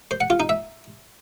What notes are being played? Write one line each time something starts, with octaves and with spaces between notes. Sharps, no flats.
C5
F#5
F4
D#4
E5